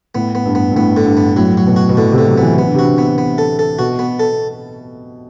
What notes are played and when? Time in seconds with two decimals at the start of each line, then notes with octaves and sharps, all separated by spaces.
0.15 A2 B3
0.35 B3
0.45 G2
0.55 B3
0.71 G2
0.76 A2 B3
0.97 D3
1.06 G2
1.17 B3
1.36 A2 F#3
1.57 F#3
1.67 B2
1.76 F#4
1.89 B2
1.97 A2 D3
2.12 C3
2.18 D3
2.27 F#3
2.38 B3
2.43 E3
2.58 E3 B3
2.66 D3
2.74 C3
2.79 D3 F#4
2.98 B3
3.18 B3
3.38 A4
3.59 A4
3.79 B2 F#4
3.99 B3
4.19 A4